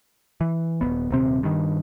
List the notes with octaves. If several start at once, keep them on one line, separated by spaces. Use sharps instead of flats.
E3
D#1 D#2 B3
D#1 C3 C4
G2 D#3